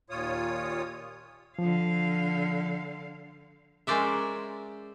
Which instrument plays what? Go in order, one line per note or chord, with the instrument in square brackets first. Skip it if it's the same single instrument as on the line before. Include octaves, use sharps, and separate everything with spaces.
[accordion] D#2 A#2 F4 C#5 D#6
[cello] D3 F5 [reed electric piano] F3
[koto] G#3 C#4 A#4 C5 D5 E5